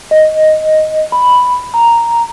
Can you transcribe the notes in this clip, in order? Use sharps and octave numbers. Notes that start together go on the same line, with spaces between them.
D#5
B5
A#5